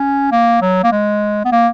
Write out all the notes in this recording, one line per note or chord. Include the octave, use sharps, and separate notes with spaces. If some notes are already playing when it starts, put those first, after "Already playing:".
Already playing: C#4
A#3
F#3
A#3
G#3
B3
A#3